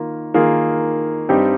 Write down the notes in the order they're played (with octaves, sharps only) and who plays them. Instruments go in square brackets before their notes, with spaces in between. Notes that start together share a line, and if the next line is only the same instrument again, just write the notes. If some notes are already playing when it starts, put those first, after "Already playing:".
Already playing: [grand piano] D#3 A#3 F4
D#3 A#3 F4 G#4
G2 G3 C4 D#4 G4